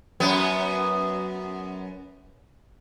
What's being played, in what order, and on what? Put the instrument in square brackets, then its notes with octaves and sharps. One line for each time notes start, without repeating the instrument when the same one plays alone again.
[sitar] F#2 B3